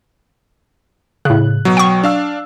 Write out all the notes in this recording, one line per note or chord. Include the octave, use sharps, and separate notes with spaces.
A2 C#3 F#6
B2 F#3
G5 C#6
D4 F5 E6